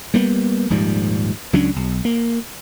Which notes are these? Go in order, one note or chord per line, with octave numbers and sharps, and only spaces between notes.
G3 A#3 B3
D#1 G#2 F3 G3
C#2 F#3 C#4 D4
B1
A#3